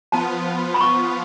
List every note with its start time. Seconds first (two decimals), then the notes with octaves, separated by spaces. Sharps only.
0.12 F3 B3 F4 A5
0.74 B5
0.81 C#6